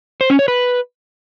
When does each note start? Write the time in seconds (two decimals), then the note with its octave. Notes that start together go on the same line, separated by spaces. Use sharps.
0.21 C5
0.30 C#4
0.39 C#5
0.48 B4